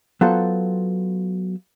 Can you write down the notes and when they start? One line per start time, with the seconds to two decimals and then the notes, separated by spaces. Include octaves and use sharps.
0.21 F#3 B3 F4 A4 C5